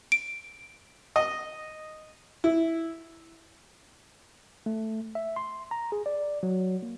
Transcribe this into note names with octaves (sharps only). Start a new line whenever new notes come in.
D7
D#5
E4
A3
E5
C6
A#5
G#4
D5
F#3
A#3